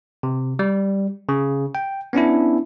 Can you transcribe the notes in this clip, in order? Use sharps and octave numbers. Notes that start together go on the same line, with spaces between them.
C3
G3
C#3
G5
B3 C#4 D4 E4